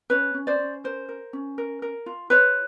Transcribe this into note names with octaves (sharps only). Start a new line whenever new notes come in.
C#4 B4 C#5
C#4
C5 D5
C#4
A#4 C5
A#4
C#4
A#4
A#4
F4
F4 B4 C#5